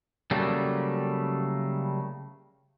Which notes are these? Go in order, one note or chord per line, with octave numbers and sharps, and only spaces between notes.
C#3 F#3 G3 A3 A#3